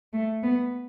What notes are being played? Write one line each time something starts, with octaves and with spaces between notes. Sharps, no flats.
A3
B3